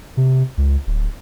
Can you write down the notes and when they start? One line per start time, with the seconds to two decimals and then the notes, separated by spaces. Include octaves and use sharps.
0.17 C3
0.58 C#2
0.87 D1